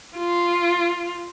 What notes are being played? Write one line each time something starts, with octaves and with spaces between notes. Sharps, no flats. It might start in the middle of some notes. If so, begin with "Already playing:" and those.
F4